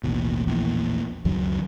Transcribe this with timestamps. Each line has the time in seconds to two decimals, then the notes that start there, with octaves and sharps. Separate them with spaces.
0.04 A1 D#2 B2
0.47 A#1 E2 A2
1.25 C#2 F#2 D#3 F#3